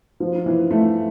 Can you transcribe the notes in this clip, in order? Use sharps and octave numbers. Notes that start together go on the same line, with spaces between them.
F3
E3
A3